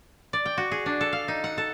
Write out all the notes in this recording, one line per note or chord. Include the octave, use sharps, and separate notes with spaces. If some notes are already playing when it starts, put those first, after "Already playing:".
D5
G5
F#4
G#4
D4
A4
F5
D#4
F#5
A4